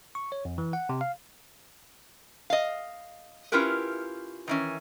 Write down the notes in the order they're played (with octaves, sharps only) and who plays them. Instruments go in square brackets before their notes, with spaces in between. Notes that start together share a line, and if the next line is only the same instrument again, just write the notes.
[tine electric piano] C#6
C#5
F2
E3
F#5
C3
F5
[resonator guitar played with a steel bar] D#5 F5
C#4 E4 F4 G4 A#4 B4
D#3 E3 C#4